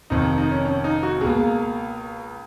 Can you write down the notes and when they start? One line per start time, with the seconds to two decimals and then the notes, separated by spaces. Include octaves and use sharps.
0.10 F1 F2 D#3 D#4
0.38 D#4
0.51 C#4
0.65 C#4
0.84 D#4
1.03 F#4
1.21 C#2 B2 A#3 G#4